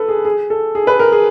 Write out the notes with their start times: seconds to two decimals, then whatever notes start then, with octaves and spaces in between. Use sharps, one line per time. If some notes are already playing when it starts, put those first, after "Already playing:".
Already playing: A4 B4
0.09 G#4
0.25 G#4
0.50 A4
0.75 G#4
0.87 B4
0.99 A#4
1.12 G#4